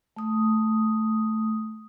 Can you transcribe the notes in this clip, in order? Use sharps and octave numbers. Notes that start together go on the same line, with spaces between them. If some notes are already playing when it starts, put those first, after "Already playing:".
A3 D#6